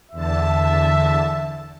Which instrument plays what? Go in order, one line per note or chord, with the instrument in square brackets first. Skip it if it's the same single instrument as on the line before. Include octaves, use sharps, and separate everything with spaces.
[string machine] E2 D3 A5 [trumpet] E5